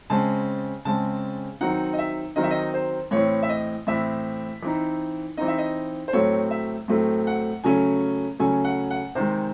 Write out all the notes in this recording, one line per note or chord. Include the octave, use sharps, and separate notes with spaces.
C#3 G#3 C4 A5
C#3 G#3 C4 A5
D#3 F#3 C4 D#4 F#5
D#5
E5
D#3 F#3 C4 D#4 D#5
E5
D#5
C5
A2 E3 C4 C#5
E5
D#5
A2 E3 C4 E5
E3 C4 D#4
E3 C4 D#4 D#5
E5
D#5
C5
A2 F#3 A3 C4 C#5
E5
A2 F#3 A3 C4
F#5
C#3 F#3 A3 C#4 G#5
C#3 F#3 A3 C#4 G#5
F#5
F#5
C3 D#3 G#3 C5